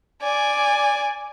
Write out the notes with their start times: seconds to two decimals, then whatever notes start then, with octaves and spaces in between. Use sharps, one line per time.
0.22 D5 G#5